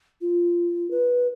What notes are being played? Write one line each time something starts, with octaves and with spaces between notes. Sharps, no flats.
F4
B4